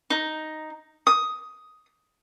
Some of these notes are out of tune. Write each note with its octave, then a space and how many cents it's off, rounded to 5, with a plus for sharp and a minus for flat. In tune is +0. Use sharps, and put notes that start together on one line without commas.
D#4 +0
D#6 +10